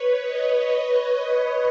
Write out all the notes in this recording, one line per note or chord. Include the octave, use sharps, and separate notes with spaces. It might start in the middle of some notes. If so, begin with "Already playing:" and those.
Already playing: B4 C#5
C#5 D#5